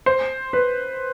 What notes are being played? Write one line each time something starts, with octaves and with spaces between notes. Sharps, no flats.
C5
B4